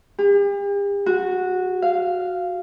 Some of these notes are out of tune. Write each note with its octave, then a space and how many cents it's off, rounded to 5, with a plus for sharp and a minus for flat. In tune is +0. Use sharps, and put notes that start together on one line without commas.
G4 +45
F#4 -10
F5 -10